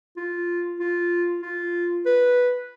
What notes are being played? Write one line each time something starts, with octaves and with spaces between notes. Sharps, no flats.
F4
F4
F4
B4